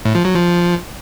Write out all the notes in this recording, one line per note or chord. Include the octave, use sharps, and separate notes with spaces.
A2
F3
F#3
F3